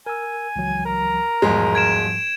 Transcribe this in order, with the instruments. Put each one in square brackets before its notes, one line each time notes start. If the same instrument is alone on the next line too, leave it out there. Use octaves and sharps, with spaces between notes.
[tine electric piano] A#4 E6 [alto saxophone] G#5
[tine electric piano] C#2 E3 F#3
[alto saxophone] A#4
[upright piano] E1 G#3 [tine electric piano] G#2 F3 G3
[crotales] G#6 D7 E7